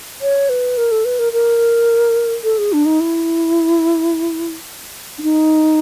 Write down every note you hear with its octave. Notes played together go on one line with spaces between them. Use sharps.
C#5
B4
A#4
A4
B4
A#4
A#4
A4
G#4
D4
D#4
E4
D4
D#4